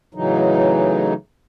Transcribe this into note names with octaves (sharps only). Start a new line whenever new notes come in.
A2 C#3 E3 F#3 D#4